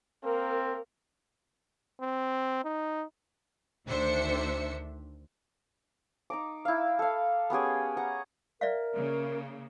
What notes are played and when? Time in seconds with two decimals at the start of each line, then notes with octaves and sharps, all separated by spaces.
0.24 A#3 C4 A#4
2.01 C4
2.64 D#4
3.87 D2 D#3 D4 C5 E5 C#7
6.30 D#4 A#5 D6
6.65 E4 F5
6.99 A4 F5
7.50 B3 C#4 G4 G#4
7.97 F#5 A#5
8.61 A#4 D5 E5 F5
8.95 C#3 A#3